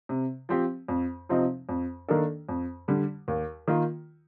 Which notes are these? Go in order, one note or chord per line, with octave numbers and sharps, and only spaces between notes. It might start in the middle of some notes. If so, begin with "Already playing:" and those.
C3
F3 C4 G4
F2
C3 F3 C4 D#4
F2
D#3 A#3 D4 A4
F2
D3 G3
D#2
D#3 A#3 F4